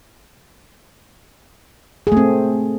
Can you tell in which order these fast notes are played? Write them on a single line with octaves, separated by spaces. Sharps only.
G#4 A3 C4